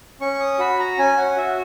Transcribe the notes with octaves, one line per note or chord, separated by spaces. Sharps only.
C#4 C#6
D#6
F#4 B5
A#5
C#4 G#5
F#5
F#4 E5